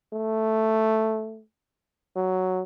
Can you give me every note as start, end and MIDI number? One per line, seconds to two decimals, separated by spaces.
0.13 1.42 57
2.16 2.63 54